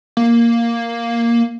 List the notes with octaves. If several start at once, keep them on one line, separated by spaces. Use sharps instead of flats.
A#3